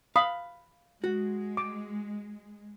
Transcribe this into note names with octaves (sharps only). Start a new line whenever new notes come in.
F5 B5 D#6
G#3 F#4
D6